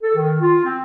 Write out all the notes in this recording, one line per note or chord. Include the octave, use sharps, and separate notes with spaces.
A4
D#3
F4
C4